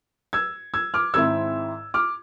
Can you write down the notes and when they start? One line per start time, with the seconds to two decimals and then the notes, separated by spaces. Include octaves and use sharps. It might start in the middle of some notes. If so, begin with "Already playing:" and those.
0.33 E6 G#6
0.74 E6 G#6
0.94 D6 F6
1.14 G#1 G#2 G#3 C4 E4 E6 G#6
1.94 D6 F6